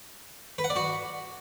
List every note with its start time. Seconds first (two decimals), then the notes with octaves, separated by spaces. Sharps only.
0.58 B4
0.64 F#5
0.70 D5
0.76 F#4